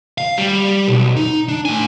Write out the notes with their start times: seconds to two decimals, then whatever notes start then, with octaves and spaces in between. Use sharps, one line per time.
0.18 F5
0.38 G3
0.88 B1
1.16 D#4
1.48 D4
1.65 A2 G#5